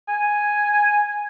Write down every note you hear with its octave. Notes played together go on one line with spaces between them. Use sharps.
G#5